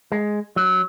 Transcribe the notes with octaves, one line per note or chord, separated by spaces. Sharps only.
G#3
F#3